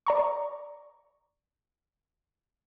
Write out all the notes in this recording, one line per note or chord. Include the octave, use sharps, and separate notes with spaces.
D5 A#5 C#6